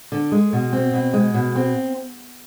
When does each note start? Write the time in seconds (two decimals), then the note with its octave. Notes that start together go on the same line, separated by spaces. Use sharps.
0.12 D3
0.32 G#3
0.53 B2
0.73 C4
0.93 B2
1.14 G#3
1.34 B2
1.55 C4